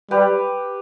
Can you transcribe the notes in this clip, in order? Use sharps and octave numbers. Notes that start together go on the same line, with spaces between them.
G3 G4 B4